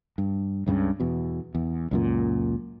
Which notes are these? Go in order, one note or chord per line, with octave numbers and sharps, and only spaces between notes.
G2
C#2 G2 A#2 C#3
E2 B2
E2
C#2 F#2 A#2